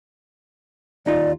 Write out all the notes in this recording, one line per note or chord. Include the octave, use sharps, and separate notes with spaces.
D#2 D#4 F4 D5